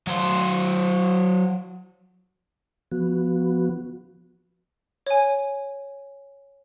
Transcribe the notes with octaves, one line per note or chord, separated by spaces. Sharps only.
F#3 C5
F3 B3 F#4
C#5 G#5